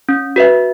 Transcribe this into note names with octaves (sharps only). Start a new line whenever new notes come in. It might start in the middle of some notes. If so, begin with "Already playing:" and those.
C#4
F#4 B4 E5